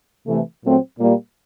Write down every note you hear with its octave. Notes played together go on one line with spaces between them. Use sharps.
C3 E3 A3
A#2 F#3 A3 C4
A#2 G3 A#3